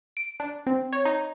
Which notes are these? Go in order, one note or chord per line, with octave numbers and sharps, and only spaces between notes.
D7
D4
C4
C#5
D#4